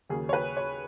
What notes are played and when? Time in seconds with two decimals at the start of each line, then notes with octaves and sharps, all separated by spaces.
0.09 D#2 C#3 F#3 A#3 G#4
0.29 C#5
0.33 B4
0.57 C#5